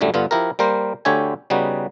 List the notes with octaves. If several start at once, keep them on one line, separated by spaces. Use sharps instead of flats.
F#2 A2 D3 G3 A3
G2 D3 B3 F4
F3 E4 G4 A#4
G3 A#3 A#4 C5
D2 D3 G4 C#5 E5 G#5
C#3 G3 B3 D#4 F#4